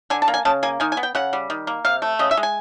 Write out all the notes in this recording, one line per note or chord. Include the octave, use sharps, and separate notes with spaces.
D3 G#5
A5
A#3
G#5
C#3 A5
A#3 G#5
D#3 G#5
G#5
B3
G5
C#3 F#5
G3
D#3
A#3
C3 F5
A3
C#3 D#5
E5
G#3
G#5